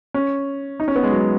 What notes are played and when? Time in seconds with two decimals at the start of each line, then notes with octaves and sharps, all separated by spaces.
0.14 C#4
0.80 D#4
0.88 C#4
0.96 B3
1.03 G#3
1.11 F#3